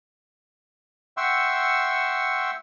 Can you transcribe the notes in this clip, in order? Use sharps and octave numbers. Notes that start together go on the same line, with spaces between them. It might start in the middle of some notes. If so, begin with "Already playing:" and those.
E5 F#5 G5 C6 C#6 E6